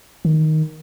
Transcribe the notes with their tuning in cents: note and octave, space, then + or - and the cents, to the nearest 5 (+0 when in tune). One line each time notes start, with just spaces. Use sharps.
D#3 +5